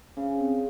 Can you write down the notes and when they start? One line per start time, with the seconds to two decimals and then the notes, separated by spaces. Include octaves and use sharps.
0.17 C#3 C#4
0.40 C4